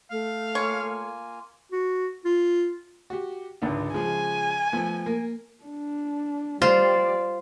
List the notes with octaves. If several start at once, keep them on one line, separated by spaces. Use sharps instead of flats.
A3 F5
A#3 F4 C#5 G#5
F#4
F4
F#4 G4
G#1 C#2 D3
C#3 F3 G#3 G#5
F3 A3 B3
A#3
D4
G3 F4 C5 D5